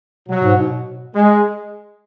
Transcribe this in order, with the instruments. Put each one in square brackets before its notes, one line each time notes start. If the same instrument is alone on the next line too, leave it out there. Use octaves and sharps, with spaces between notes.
[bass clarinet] B2 [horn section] F#3
[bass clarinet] G#2
B2
[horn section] G#3